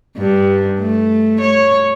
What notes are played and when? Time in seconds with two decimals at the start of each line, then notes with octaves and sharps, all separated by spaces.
0.17 G2
0.79 A3
1.40 C#5